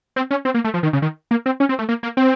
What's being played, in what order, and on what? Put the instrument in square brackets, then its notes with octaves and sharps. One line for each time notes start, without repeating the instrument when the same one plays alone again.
[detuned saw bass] C4
C#4
C4
A#3
A3
F3
D#3
C#3
D#3
A#3
C4
C#4
C4
A3
A#3
A#3
C4